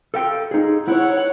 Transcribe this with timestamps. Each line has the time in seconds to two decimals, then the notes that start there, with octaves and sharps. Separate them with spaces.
0.14 A4 F5 G5
0.51 D#4 G#4
0.88 E4 C#5 F#5